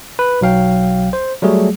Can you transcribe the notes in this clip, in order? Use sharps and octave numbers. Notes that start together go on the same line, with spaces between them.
B4
B1 F#3 F5 G5
C5
F#3 G3 A3 G#4